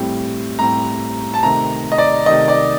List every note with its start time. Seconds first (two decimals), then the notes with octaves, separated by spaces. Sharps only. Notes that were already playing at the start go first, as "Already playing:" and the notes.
Already playing: A2 G3 C4
0.59 A2 G3 C4 A#5
1.34 A5
1.43 C3 D#3 A3 A#5
1.92 D#5
1.98 D5
2.26 C3 D#3 A3 D#5
2.48 D5